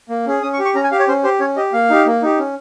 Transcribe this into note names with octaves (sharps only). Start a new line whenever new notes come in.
A#3
C#4 G#4
C#4 D#6
C#6
G4
C#6
C#4 A#5
G#5
G4 F5
C#5
C#4 C5
G4 C5
C#4 C#5
G4 D#5
A#3 F5
D#4 G4
A#3
D#4 G4
C#4